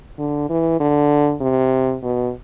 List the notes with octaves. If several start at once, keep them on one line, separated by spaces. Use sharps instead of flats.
D3
E3
D3
C3
B2